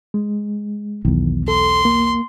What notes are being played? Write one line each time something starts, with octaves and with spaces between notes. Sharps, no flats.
G#3
B1 E2 D#3
A4 C6
A#3